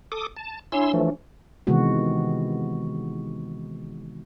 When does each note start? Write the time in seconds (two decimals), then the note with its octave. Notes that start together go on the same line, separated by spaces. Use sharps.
0.12 A4 D6 D#6
0.37 A5
0.72 D4 E4 C#5 G#5 C6 E6
0.93 E3 F3 A3
1.67 C3 D#3 E3 G#3 B3 F#4